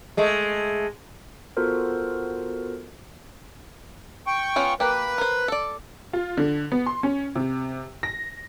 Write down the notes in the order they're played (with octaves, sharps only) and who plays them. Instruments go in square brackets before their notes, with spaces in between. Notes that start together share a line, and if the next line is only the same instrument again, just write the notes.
[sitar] G#3 A3
[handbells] B3 F4 F#4 A4 A#4 C5
[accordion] G5 C#6
[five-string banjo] B3 C#4 F4
[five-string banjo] A#3 G4 [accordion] B4
[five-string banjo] A#4 C5
A4 D5
[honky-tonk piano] F4
D3
B3
C6
C#4
C3
A#6